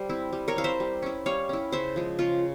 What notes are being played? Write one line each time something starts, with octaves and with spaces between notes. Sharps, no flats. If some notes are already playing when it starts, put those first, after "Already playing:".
Already playing: G3 C5
C4 E4
G3
A#4 C#5
C4 E4 F5
C5 E5
G3
C#4 E4
G3 C#5 F5
C#4 E4
C#3 C5 E5
F3 G#3
C#3 F4